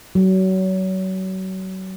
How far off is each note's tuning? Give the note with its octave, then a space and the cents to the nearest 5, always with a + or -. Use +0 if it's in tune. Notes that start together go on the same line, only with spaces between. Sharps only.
F#3 +30